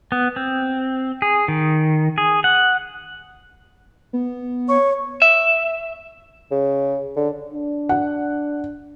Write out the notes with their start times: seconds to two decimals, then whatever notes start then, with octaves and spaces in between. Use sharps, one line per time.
0.12 B3
0.36 C4
1.22 G#4
1.48 D#3
2.18 G#4
2.44 F#5
4.13 B3
4.69 C#5 C#6
5.22 E5
6.51 C#3
7.16 D3
7.53 D4
7.89 F#5